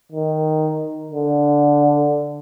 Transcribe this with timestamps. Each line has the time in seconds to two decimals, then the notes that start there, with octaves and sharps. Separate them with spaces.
0.12 D#3
1.12 D3